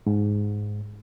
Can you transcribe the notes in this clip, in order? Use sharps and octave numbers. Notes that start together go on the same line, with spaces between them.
G#2